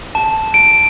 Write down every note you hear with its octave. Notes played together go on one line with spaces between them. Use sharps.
A5
D7